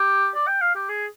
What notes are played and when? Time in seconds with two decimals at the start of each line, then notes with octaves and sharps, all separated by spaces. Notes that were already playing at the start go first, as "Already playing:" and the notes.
Already playing: G4
0.34 D5
0.47 G5
0.61 F5
0.75 G4
0.89 G#4